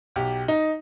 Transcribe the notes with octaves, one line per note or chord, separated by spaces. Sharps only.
B1 G4
D#4